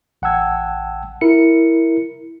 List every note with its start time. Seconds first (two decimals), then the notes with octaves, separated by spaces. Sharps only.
0.22 A1 F#5 G5 A5 E6 G#6
1.21 E4 A#4 C#7